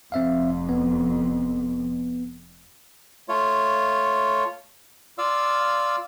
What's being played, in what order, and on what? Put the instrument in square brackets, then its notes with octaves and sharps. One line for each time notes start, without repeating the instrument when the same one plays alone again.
[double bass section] F1 F2 [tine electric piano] C4 E5 F5
[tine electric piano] B3
[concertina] A3 F4 C#5
F4 D5 F5 E6